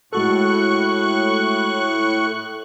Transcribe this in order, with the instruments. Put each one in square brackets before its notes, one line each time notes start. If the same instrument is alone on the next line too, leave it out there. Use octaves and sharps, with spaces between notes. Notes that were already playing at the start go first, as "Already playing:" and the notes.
[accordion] A2 C#6 F#6 [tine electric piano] G#3 F#4 A4